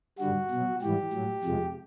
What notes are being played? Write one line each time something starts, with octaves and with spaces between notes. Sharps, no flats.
G2 D3 G3 F#4
B2 F#3
G#2 E3 G3 G4
A2 F#3
F2 C3 F3 G#3